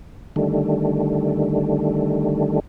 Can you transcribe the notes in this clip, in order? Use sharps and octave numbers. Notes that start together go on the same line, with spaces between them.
D3 D#3 G3 A3